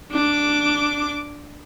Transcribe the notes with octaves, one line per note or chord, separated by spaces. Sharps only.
D4 D6